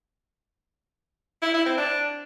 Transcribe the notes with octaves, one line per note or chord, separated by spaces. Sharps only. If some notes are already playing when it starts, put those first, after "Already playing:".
E4
E4
C4
D4